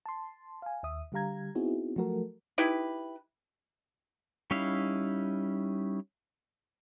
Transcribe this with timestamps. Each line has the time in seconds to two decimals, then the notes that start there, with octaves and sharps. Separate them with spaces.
0.06 A5 C6
0.62 F5 G#5
0.83 D#2 E5 D#6
1.12 D3 G3 G4 F5 A#5 G#6
1.55 B3 C4 D#4 E4 F#4 G#4
1.96 F3 F#3 A3 F#4 A4 A#4
2.58 D#4 E4 G4 B4
4.51 G3 C#4 D#4 E4 F5